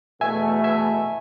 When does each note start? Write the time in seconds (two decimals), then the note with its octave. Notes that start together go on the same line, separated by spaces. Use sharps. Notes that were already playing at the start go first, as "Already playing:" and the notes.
0.21 E2 B2 A3 E5 G#5
0.64 E5 G#5